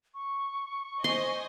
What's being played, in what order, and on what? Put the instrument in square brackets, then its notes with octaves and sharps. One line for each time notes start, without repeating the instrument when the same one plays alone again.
[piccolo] C#6
[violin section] C5 D#5 G#5 [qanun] C6